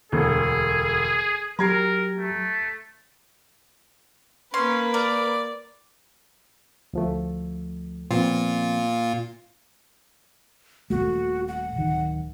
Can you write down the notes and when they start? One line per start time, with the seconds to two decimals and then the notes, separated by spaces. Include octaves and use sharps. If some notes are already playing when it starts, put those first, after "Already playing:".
0.12 E1 D2 G#4
1.59 F#3 G4 A#4 A#5 G#6 C7
2.17 A3
4.54 A#3 C#4 B4 C6
4.94 A#4 D5
6.93 D2 F3 A3
8.11 A#2 F3 B3 C4 F4
10.90 D#1 G#1 A3 F#4
11.48 F#5
11.76 D1 D#3